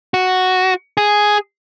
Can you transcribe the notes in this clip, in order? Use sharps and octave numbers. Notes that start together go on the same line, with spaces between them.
F#4
G#4